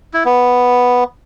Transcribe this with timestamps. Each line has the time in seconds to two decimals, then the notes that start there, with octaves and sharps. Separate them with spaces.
0.14 E4
0.25 B3